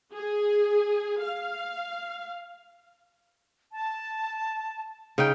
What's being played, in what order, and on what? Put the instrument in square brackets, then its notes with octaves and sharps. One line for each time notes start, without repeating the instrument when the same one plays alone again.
[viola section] G#4
F5
[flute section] A5
[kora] C#3 D#4 G5